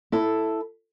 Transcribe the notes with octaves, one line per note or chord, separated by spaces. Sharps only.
E4 A4